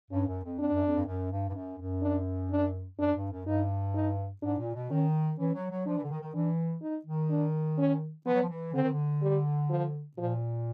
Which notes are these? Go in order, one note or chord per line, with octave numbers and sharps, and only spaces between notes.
G2 C#4
F#2
F2
F2 D4
F#2
F2
G2
F#2
G2
G2
F#2
F#2
D4
D4
F#2 D4
G2
F#2
G2 D#4
D#4
G#2 D4
A#2
B2
D#3 C#4
E3 C#4
F#3
F#3
F3 D4
E3
D3
D#3
D#3
E3 D4
D#4
D#3
D4
C#4
F3 B3
F#3
F3
E3
D3 C4
D#3
D3
G3
F3
A#2 F3